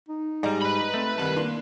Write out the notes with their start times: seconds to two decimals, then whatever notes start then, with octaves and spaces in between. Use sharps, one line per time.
0.09 D#4
0.43 G#2 G3 D5 D#5 A#5
0.62 B4 B5
0.94 A3 C4
1.18 F1 C2 G2 D#3 A5
1.36 A#3 D4 C6